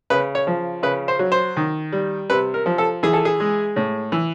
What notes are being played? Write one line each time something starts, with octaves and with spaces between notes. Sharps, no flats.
C#3 B4
C#5
F3
C#3 B4
C5
F#3
C5
D#3
G3
C3 B4
A#4
F3
A4
E3 G#4
A4
G#4
G#3
A2
E3